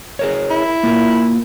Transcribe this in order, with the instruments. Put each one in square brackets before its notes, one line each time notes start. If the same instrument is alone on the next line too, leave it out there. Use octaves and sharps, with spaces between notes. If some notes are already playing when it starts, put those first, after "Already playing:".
[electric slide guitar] G#4 A#4 C#5
[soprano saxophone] E4
[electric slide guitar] A#3 F4 A#4